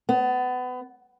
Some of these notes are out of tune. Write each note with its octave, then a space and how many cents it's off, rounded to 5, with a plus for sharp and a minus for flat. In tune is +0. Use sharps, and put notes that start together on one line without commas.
B3 +25